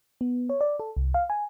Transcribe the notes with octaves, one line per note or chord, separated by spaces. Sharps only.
B3
C#5
D5
A4
C2
F5
G#5